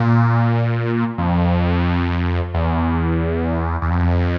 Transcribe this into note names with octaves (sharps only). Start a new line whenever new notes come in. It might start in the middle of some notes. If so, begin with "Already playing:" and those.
Already playing: A#2
F2
E2
E2
F2